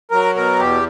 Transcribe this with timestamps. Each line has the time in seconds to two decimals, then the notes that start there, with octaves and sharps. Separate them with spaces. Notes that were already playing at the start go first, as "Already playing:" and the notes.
0.11 F#3 A#4
0.35 B2 A#4
0.59 E2 G4